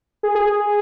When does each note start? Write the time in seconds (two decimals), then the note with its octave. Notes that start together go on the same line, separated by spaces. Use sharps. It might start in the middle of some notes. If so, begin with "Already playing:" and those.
0.23 G#4
0.35 G#4
0.47 G#4